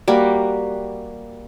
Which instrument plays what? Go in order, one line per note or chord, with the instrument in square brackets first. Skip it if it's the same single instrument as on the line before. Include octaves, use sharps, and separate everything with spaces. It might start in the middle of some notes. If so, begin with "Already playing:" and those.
[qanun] G3 A#3 F#4